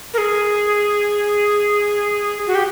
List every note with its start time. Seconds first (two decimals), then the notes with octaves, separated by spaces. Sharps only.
0.14 A#4
0.18 G#4
2.47 F#4
2.55 G4